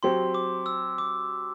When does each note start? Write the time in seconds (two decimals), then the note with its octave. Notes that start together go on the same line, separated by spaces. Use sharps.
0.03 F#3 C4 G4 C6
0.34 D6
0.66 E6
0.98 D6